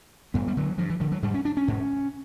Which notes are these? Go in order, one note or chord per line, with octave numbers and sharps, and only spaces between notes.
G2 B3
G3
D3 F#3
G2 F3
E3
D3 F3
F#3
G#2 G3
C#4
D4
C#4
G#2